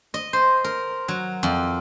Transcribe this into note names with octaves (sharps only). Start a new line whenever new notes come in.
D#5
C5
A#4
F#3
F2